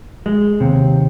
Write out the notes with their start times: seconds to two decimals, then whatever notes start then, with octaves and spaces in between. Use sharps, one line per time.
0.26 G#3
0.60 D#2 C3